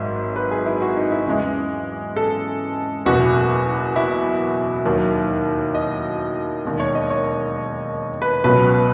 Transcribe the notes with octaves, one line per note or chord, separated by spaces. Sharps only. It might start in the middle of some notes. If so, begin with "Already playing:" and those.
Already playing: G#1 G#2 F#3 E5
B4
G#4
E4
F#4
D#4
E4
E2 C#3 E3 G#3
A4
F#1 E2 B2 F#4
E4
D#2 D#3 F#3
D#5
E1 D#2 D#3
C#5
D#5
C#5
B4
C#2 B2 F#3 B4